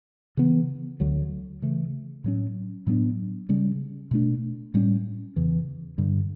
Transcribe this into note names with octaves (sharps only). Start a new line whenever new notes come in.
C#3 E3 B3
D2 D3 F#3
C#3 E3 A3
A2 F#3 C#4
A2 F#3 B3 D4
C#3 G3 C#4
B2 A3 D4
A2 G3 C#4
E2 C#3 E3
G2 D3 G3